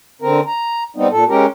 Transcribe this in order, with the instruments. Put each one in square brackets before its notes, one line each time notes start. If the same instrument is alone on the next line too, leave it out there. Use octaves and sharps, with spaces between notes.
[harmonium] D3 C4 A#4
A#5
G3 B3 C4 D#4
A#2 A4
G#3 C#4 G4 A#4